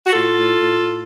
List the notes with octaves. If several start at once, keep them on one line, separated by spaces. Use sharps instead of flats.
F#4
A2 F4 A4
A2
A2
A2